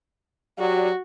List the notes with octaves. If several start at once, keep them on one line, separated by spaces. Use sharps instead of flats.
F#3 F#4 G4 D5